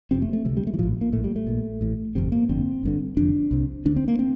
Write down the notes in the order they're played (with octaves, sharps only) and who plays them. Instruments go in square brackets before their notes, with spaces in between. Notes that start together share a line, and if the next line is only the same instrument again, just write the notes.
[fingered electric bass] F1 F2 C3 C4
A3
A3
C3 F3
D2
G3
A3
E3
A2 F3
A#1
A#3
A2 A3
A#1
G3
A3
A#1 A#2
A1 A2
G1 F2 C3 C4
A#3
G1 F2 D3 C4
G1 G2 D3
F1 F2 D3 D4
C2 C3
D2 D3 D4
C4
A#3
C4